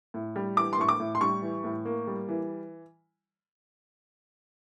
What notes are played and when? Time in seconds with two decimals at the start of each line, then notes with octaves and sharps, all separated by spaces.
0.14 A2
0.36 G3
0.56 E3 D6
0.73 C6
0.78 A2 C#6
0.88 D6
1.00 A2
1.15 C6
1.21 G3 C#6
1.42 E3
1.64 A2
1.85 A#3
2.07 G3
2.28 E3